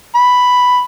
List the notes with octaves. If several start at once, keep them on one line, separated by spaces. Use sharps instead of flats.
B5